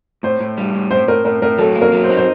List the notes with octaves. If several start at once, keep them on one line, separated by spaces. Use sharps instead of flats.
A2 C5
A2
G3
A2
A2 C5
A2 A#4
A2 A#4
A2 A#4
F#3 A4
A#3
A#4
F#3
C5
D#4
C5